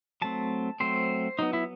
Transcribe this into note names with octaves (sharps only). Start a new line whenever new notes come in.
F#3 A3 C4 A5
F#3 A3 C4 C5
F#3 B3 D#4
E4